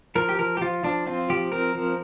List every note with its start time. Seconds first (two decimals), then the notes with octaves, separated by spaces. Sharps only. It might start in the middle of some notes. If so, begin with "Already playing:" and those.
0.15 F3 A#4
0.29 G4
0.39 F3 A#4
0.57 G4
0.61 F3 F4
0.83 F3 D4
1.06 C4 F4
1.30 F3 G4
1.52 C4 A#4
1.75 F3